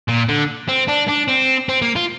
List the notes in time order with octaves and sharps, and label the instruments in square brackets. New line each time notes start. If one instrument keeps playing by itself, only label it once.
[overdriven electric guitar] A#2
D3
C4
D4
D4
C4
C4
A#3
F4